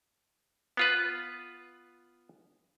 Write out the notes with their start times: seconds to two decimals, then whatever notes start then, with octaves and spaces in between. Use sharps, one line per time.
0.77 B3 F4 B4